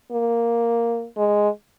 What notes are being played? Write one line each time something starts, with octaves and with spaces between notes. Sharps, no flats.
A#3
G#3